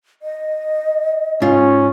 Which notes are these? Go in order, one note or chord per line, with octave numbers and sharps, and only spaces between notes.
D#5
G#2 C#4 F4